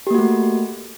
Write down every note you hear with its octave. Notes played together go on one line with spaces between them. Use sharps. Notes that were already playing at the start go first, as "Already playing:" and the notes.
A3 A#3 F#4 G4